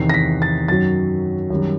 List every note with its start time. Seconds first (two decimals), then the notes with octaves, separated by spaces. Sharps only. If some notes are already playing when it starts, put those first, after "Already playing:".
Already playing: E2 C3 D#3 C7
0.10 A#6
0.14 B6
0.42 A6
0.68 F#2 D#3 F#3 A6
1.50 F#2 D#3 G3